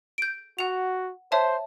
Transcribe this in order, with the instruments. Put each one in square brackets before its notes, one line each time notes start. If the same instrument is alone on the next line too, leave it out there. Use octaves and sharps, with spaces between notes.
[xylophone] G6 D7
[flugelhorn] F#4 [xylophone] F#5 F7
[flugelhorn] C5 [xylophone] C#5 E5 A5